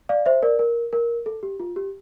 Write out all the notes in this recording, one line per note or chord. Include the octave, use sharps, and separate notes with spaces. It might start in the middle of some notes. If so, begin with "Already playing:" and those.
D5 F5
C5 E5
A#4 D5
A#4
A#4
A4
G4
F4
G4